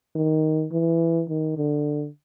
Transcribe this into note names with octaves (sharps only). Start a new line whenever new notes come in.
D#3
E3
D#3
D3